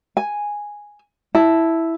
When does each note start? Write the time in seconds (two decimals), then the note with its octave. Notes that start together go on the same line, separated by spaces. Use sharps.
0.17 G#5
1.35 E4 A5